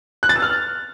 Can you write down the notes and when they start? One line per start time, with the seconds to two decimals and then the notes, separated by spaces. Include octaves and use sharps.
0.23 F#6
0.29 A6
0.36 E6
0.42 F6